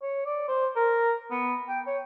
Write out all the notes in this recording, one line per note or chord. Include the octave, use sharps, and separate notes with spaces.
C#5
D5
C5
A#4
B3
G5
C#5